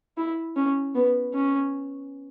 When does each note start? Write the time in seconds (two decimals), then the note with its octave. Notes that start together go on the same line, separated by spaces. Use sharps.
0.17 E4
0.56 C#4
0.95 B3
1.34 C#4